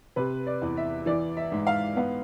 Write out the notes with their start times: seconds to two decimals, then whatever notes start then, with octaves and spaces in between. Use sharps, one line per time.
0.16 C3 B4
0.47 D5
0.62 E2
0.77 E5
1.06 E3 D5
1.37 E5
1.52 G#2
1.67 F5
1.96 B3 F5